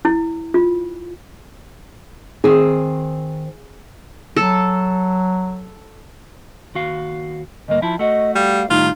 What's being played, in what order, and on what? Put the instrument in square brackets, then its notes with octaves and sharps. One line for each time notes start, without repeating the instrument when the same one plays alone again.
[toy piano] E4
F4
[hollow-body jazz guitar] D#3 C4 [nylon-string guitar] G#4
[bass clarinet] F#3 [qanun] A4
[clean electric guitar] D#2 F#4 F5
[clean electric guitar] D2 G2 A#3 [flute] D#5
[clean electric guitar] F3 E4 [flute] A5
[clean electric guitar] A3 F#4 [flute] D#5
[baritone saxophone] G3 [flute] F5
[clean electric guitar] A2 D#3 G3 [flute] D#4 [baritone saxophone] F4